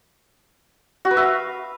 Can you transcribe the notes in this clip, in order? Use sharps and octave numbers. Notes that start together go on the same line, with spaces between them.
F#4
B4
E5
F5